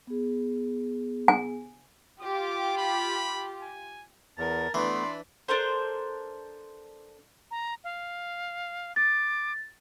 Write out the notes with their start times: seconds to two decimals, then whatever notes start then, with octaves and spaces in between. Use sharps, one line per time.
0.07 B3 G#4
1.28 G#5
2.21 F4 G4 D6
2.77 B5
3.62 G#5
4.38 E2 A#4 A5
4.74 E3 A3 B3 D4 B4 D5 C6
5.48 D4 A4 A#4 C5
7.51 A#5
7.84 F5
8.96 D6 A6